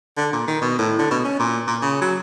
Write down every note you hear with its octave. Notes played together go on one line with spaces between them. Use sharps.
D3
A#2
D#3
B2
A2
D3
B2
C#4
A#2
A#2
C#3
F#3